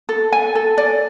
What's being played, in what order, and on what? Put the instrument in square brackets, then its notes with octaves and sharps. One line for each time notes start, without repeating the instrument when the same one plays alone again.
[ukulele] A4
G#5
A4
D5